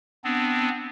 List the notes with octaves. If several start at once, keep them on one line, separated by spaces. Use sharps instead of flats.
B3 C4 D4